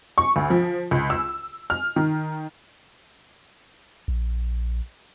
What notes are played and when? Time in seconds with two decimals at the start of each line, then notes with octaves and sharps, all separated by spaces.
0.18 C#6
0.36 D2
0.50 F3
0.91 C#2
1.10 E6
1.70 F6
1.96 D#3
4.08 A#1